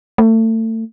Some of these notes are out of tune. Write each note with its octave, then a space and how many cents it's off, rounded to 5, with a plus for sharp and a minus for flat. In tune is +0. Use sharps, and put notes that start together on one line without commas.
A3 +30